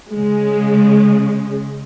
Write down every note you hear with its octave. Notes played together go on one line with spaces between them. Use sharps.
C#3 G#3